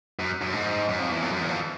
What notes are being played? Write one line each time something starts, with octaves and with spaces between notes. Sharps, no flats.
F#2
F#2
G#2
F#2
F2
E2
F2
F#2
E2
F2